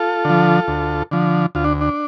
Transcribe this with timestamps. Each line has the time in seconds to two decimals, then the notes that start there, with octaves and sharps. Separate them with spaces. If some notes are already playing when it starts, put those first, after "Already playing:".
Already playing: F4 A4
0.25 D3 F3
0.68 D2
1.11 D3 F3
1.55 D2 F4
1.64 D4
1.81 D4